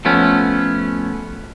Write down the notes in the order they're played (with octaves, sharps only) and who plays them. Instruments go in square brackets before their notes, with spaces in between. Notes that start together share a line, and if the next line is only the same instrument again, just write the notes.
[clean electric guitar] F3 A3 B3 C#4